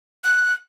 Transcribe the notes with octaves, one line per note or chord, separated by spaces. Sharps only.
F#6